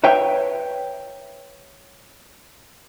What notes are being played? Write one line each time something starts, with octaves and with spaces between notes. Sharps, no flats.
B4 C#5 E5 G5